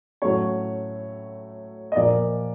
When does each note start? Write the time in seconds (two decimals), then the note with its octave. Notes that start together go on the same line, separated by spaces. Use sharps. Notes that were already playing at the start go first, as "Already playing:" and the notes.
0.22 A2 F#3 A3 C#4 C#5
1.92 D#5
1.96 A#2 F3 A#3 D5